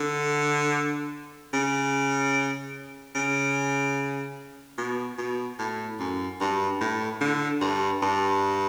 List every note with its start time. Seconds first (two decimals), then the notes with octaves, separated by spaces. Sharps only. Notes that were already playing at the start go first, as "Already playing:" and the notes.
Already playing: D3
1.53 C#3
3.15 C#3
4.78 B2
5.18 B2
5.59 A2
5.99 F#2
6.41 G2
6.81 A2
7.21 D3
7.61 G2
8.02 G2